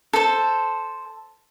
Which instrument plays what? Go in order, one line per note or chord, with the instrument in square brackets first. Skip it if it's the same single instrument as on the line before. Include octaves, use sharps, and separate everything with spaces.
[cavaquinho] A4 C5